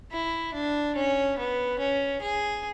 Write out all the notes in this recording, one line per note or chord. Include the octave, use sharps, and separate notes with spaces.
E4
D4
C#4
B3
C#4
G#4